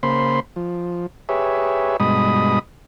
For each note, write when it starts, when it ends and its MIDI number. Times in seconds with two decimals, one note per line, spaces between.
0.03 0.40 49
0.03 0.40 58
0.03 0.40 72
0.03 0.40 83
0.03 0.40 84
0.56 1.06 53
1.29 1.97 67
1.29 1.97 68
1.29 1.97 71
1.29 1.97 73
1.29 1.97 76
2.00 2.59 43
2.00 2.59 47
2.00 2.59 56
2.00 2.59 75
2.00 2.59 83
2.00 2.59 87